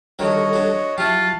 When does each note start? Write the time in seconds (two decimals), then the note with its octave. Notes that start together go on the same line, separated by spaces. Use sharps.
0.19 D3 D#3 F#3 G3 F#4 A4 C#5 D#5
0.53 F#3 D4
0.98 F#3 E4 F4 G4 A5 C#6 F#6